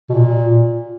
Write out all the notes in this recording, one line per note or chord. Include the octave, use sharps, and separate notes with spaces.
B2
A#2